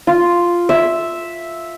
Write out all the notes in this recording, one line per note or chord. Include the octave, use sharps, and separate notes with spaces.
F4
E5